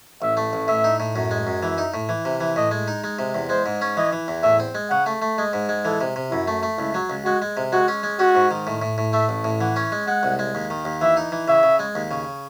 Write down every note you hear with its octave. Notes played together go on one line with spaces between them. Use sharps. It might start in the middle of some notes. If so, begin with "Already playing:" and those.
A1 E5
A3
A1
A2 E5
D#4
A2
F#2
G#3
F#2
E3 E5
D#4
A2
E3
C3
E3
A2 D#5
G#3
D#4
G#3
C3
E2
G#3 C5
G#2
C#4
E3 D#5
E3
E2
A2 E5
C4
G#3
C#3 F#5
A3
A3
G#3 D#5
G#2
G#3
E3 A4
C3
C3
F#2 E4
A3
A3
C#2 E4
F#3
C#2
G#3 F#4
G#3
C3
G#3 F#4
C#4
G#3
C#4 F#4
G#2
D#3
A2
A2
A2
A3 E5
A1
A2
E3 F#5
C#4
G#3
G#3 F#5
C2
G#3
D#2
D#3
D#2
E3 E5
D#4
E3
C#3 E5
C#3
G#3
D#2
C#3